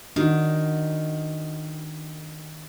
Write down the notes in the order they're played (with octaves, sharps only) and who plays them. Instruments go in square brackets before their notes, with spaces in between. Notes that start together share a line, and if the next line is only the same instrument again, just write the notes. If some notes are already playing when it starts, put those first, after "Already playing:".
[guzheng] D#3 [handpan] D4 F#4